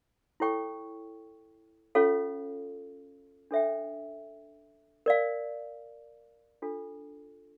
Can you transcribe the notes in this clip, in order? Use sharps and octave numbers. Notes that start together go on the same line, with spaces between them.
E4 A4 C#5 G5 C#6
C#4 F4 A4 C#5 F5
D4 A4 C#5 E5 G5
A#4 D5 F5
D4 F4 A4